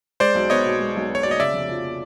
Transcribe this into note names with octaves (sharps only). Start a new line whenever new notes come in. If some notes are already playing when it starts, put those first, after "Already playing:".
G#3 C5 D5
B1
B3 C#5 D#5
B2
G#3
B1
B3
C#5
B2 D5
D#5
C#3 D5 E5
F1
F3